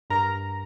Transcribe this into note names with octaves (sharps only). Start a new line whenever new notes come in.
G2 A#4 A#5